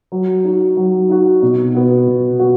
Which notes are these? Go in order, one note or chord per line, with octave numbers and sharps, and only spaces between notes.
F#3
D#4 F#4
F#3
D#4 F#4
B2
B3 F#4
B2
B3 F#4